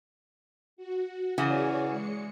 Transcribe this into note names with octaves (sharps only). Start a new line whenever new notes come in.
F#4
C#3 E3 F#4 G#4 C#5 D5
G#3 C#7